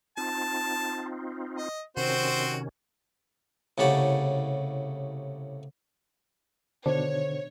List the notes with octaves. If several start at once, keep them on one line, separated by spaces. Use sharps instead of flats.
C4 D#4 F4 A5
D#5
C3 D#3 C4 C#4 F#4 C5
C2 A2 C#3 G4 F#5 A5
B2 D3 D#3 D4 C5 C#5